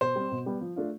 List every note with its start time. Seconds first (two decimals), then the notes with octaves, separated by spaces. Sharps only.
0.01 B2 C5
0.16 G3 C4
0.31 B2
0.46 G3 B3
0.61 F3
0.76 A3 D4 F4